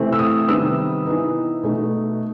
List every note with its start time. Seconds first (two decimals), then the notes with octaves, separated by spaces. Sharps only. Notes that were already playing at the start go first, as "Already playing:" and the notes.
Already playing: C3 E3 A3 C4
0.13 E6
0.19 D#6
0.48 C3 D#3 G3 B3 E6
1.05 E3 B3 D#4
1.63 B2 A3 D#4